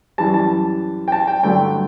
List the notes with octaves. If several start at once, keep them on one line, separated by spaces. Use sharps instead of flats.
F#2 E3 G3 A5
A5
G5
A5
G5
G2 D3 F#3 A3 G5